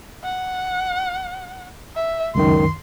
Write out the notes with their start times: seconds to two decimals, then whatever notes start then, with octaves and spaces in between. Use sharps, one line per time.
0.24 F#5
1.96 E5
2.35 C#2 F#2 D#3 C6